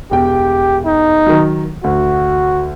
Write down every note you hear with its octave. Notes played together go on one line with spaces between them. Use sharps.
E1 G4 G5
D#4
D#3 F#3
D2 F#4